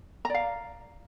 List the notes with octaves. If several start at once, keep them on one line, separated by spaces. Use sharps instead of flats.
D5 F5 A#5